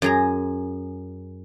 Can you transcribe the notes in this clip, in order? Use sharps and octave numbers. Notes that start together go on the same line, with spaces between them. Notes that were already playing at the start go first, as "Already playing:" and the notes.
F#2 G#4 A#5